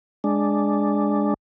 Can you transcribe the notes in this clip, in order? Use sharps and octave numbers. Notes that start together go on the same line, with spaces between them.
G#3 D4